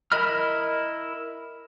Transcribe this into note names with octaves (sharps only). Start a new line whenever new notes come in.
E4 A#4 D#5 B5 F6